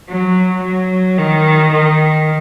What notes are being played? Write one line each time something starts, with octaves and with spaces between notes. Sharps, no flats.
F#3
F#3
D#3
D#3